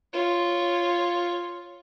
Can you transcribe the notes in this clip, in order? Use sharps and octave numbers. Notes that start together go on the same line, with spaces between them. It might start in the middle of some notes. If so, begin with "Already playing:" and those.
F4 C#5